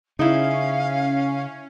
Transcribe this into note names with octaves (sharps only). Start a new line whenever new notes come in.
C#3 C#4 D#4 E4 F5